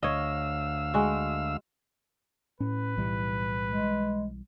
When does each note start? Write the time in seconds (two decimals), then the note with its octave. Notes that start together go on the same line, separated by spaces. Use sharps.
0.03 D2 C#5 D#5 F5 E6
0.94 G#3 F#4
2.61 A2 C#4 B4
2.97 B1 E3 G3
3.66 G#3